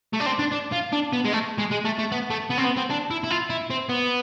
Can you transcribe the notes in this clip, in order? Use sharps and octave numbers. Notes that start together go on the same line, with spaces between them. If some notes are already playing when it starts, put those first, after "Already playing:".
A3
D4
C4
D4
D4
F4
D4
B3
G#3
A3
G#3
G#3
A3
A3
B3
A3
B3
C4
B3
C4
D4
E4
E4
F4
E4
C4
B3